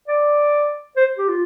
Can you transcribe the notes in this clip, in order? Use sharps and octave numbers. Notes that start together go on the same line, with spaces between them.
D5
C5
G4
F4